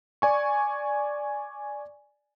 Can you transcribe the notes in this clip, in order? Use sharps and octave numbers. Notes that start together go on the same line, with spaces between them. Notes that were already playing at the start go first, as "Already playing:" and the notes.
D5 G#5 C#6